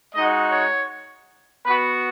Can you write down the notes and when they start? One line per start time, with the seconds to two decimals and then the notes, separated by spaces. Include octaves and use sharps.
0.14 G#3 D#4 F#4 D#5
0.51 C#5
1.66 B3 F#4 B4